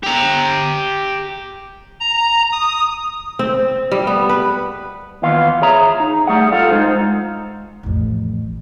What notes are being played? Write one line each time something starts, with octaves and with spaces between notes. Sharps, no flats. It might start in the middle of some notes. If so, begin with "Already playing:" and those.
G4 A#5
A#5
D#6
C4
G3
B3
B4
D#2 E3 B3 F4 F5
G#4 C#5 E5 A#5
D#4
G3 A3 G#4 F#5
F4 A4 F5 F#5
G#3 D#4 C5
A1 F2